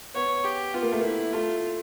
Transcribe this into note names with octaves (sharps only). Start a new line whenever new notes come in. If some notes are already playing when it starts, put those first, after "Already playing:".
B3 C#5
G4
B3 F4
A#3
A3
A#3 E4
A3 F4